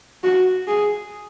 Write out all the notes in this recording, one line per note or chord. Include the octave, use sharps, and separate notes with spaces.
F#4
G#4